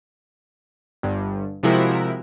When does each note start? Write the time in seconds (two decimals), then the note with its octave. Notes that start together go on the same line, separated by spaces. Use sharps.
1.03 G1 G2
1.63 C3 F3 G#3 E4 F#4 A#4